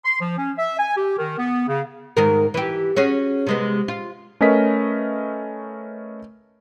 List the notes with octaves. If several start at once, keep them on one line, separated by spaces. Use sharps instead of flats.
C6
F3
C#4
E5
G#5
G4
D#3
B3
C#3
G#2 D#3 A#4
E3 G4
C#4 F#4 G#4
C3 G#3 B3
F4
A3 C#4 A#4 B4 D#5 B6